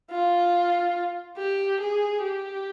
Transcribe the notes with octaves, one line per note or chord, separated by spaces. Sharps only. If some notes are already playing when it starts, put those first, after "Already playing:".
F4
G4
G#4
G4